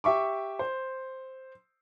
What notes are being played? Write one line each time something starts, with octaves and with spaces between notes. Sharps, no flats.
G4 E5 C#6 D6
C5